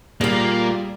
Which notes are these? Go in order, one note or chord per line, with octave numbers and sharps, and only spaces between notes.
A#2 G3 A#3 F4 G#4 D5